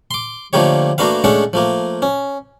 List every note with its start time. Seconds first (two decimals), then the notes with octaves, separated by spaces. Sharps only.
0.11 C6 D6
0.53 D3 F3 A3 A#3 G4 C#5
0.98 A3 A#3 D4 F#4 B4 F5
1.24 G#3 A3 C#4 D4 A4 F#5
1.53 F3 A3 A#3
2.02 C#4